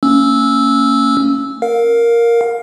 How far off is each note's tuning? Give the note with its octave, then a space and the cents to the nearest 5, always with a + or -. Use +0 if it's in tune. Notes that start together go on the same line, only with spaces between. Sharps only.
A#3 -30 C#4 +0 E6 -10
A#4 +0 F5 +20